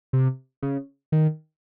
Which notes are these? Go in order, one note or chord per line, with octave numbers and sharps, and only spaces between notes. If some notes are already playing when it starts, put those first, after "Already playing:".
C3
C#3
D#3